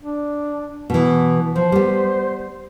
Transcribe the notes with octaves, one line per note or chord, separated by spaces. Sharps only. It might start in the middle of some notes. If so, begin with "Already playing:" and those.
D4
B2 E3 B3
F3 C5
G3 B3